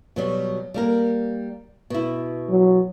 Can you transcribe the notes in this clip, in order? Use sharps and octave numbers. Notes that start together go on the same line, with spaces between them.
B2 F#3 G3
G3 A#3 A#4
B2 E4
F#3